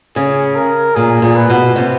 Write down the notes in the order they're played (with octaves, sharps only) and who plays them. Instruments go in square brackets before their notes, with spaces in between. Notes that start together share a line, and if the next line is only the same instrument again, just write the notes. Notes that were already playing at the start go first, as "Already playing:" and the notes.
[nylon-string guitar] C#3 [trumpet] G#4
[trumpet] A#4
[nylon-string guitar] A#2 [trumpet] G#4
[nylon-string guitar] A#2
[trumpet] B4
[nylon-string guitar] B2
C3